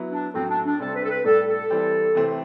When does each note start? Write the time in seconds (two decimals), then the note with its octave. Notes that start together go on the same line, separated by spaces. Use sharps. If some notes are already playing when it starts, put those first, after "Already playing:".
Already playing: F#3 B3 E4
0.11 D4
0.34 A2 F#3 A3 C4
0.50 D4
0.65 D4
0.80 C3 G3 C4 A4
0.95 B4
1.04 A4
1.10 B4
1.25 A2 G3 D4 A4
1.48 A4
1.70 E3 G3 C4 G4
2.15 C3 E3 A3 C4